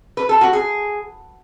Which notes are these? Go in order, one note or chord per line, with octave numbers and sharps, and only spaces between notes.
B4
A4
F#4
G#4